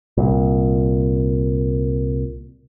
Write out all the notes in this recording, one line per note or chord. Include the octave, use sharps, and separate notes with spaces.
C2 A#2